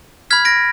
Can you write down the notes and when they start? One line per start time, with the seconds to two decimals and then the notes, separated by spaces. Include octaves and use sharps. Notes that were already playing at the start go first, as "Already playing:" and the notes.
0.30 B5 F6 G#6 B6
0.45 A#6 D7